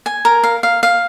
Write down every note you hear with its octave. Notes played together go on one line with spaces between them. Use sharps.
G#5
A#4
F5
F5
F5